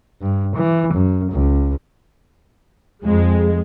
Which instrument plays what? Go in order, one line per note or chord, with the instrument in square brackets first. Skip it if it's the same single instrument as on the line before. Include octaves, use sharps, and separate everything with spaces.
[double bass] G2
E3
F#2
C#2
[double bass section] F2 [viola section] G#3